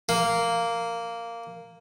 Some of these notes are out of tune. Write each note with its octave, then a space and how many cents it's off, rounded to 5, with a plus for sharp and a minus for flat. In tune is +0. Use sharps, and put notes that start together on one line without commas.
A#3 -10